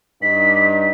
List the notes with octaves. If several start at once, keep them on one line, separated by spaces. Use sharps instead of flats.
G2 D#4 B6